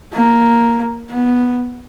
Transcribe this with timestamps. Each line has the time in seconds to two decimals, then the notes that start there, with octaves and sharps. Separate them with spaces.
0.14 A#3
1.10 B3